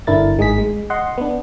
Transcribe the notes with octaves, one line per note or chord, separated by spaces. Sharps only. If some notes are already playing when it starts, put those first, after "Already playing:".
G1 D3 D4 E4 A#4 A6
G#1 G#3 D#4 G#4 B6
G#3
D#5 F#5 C6
B3 D4